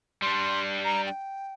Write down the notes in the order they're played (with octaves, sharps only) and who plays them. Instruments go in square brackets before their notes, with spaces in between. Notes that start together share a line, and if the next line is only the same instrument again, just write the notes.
[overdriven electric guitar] G3 D4 [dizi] C6
[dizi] A#5
G5